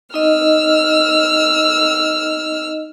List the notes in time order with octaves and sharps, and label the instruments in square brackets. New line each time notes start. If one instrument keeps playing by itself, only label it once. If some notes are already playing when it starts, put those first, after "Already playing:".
[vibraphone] D#4 D#5 [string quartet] E6 F6